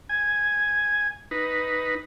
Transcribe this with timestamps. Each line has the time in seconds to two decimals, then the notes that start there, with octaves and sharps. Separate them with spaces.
0.09 G#5
1.31 D#4 B4